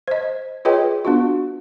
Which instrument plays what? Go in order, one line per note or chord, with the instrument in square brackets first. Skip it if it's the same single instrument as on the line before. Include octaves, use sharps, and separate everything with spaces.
[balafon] C5 D#5
F4 G#4 B4 C#5 D#5 G5
B3 D4 F4 F#4